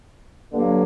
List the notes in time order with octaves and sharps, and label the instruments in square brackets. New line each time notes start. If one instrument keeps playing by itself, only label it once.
[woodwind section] G2 D3 F#3 A#3